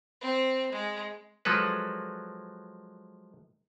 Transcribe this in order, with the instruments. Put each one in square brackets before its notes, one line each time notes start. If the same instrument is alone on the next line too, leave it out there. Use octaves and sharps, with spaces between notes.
[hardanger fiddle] C4
G#3
[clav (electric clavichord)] F3 F#3 G#3 A4 B4